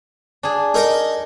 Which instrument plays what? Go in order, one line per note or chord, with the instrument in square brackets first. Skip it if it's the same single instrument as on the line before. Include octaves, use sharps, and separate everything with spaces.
[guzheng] D4 G#4
[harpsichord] D#4 A#4 D#5